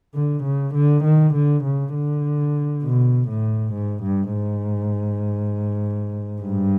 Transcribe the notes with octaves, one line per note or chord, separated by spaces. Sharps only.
D3
C#3
D3
D#3
D3
C#3
D3
B2
A2
G#2
G2
G#2
G2